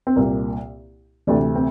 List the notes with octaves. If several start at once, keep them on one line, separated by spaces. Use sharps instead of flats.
C4
C2 A#2 A#3
D2 C3 E3 D4
C4